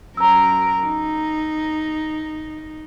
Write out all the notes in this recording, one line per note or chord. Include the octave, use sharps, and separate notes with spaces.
F#2 A#4 A#5 E6
D#4